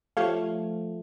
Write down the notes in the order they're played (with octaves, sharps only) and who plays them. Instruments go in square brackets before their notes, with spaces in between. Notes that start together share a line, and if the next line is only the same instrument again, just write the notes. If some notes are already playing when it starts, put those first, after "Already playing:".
[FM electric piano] F3 A3 [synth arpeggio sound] G4 C#5 F5